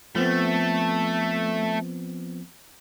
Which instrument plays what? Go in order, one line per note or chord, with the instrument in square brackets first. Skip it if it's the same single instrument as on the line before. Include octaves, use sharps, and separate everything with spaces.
[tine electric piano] F3 B3 C4 [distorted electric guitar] A3